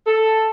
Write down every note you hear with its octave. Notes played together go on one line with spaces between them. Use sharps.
A4